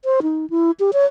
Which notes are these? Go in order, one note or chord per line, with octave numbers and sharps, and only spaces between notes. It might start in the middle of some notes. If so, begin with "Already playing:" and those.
C5
D#4
E4
G4
C#5